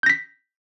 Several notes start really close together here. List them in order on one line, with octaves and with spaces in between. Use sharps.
G6 A#6 B6